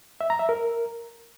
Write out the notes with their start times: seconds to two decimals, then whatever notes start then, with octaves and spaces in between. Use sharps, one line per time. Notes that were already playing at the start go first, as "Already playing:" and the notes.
0.21 E5
0.30 A#5
0.39 E5
0.49 A#4